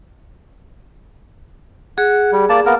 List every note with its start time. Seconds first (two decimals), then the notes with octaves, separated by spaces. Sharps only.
1.98 G#4 F#5
2.32 G3
2.49 A#3 D5 A5
2.66 A#3 B3 A#4